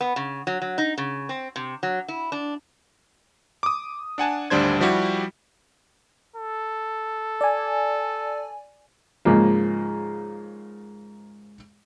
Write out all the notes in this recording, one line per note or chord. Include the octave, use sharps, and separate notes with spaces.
B3
C#3
F#3
F#3
D#4
C#3
C4
C3
F#3
E4
D4
D6 D#6
D4 F#5 G#5 A5
G#1 D2 G3 D4 C5 G#6
F3 G3 E4 F#4 G4
A4
D5 G#5
G#2 C#3 F3 A#3